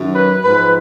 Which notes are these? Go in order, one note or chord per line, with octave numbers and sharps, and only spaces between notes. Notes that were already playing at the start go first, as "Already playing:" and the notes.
Already playing: F#2 D#3 F#3
B4
G#2 F3 B4